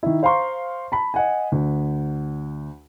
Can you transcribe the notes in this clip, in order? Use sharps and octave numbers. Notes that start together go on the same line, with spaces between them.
D#3 E4
C5 F5 A#5 C6 C#6
A5 B5
D#5 F#5 G#5
D2